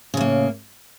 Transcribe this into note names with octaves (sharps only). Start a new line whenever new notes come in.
A2 C#3 A#3